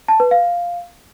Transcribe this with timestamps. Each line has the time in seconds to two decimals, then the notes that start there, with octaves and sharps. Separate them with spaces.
0.08 A5
0.20 B4
0.31 F5